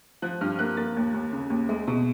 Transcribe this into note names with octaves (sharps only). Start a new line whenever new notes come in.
F3 F#6
G2 F6
A#3 F#6
A#3 A6
D#2
D#2
C#3
D#2
G#3
B2